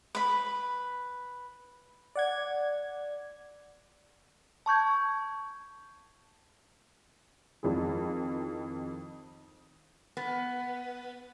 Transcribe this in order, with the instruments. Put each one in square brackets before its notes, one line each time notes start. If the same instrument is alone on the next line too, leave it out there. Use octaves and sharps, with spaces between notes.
[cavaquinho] B4 B5
[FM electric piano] D5 F#5 G#6
[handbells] A5 C#6 G6 G#6
[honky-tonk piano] F2 D#3 E4 G#4
[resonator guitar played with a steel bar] B3